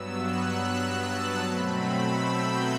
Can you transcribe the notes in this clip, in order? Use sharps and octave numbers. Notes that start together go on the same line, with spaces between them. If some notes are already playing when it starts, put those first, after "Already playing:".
Already playing: G2 F#3 B3 E6
F#6
A5
B2 F#3 A3 C4 B5
E6
G6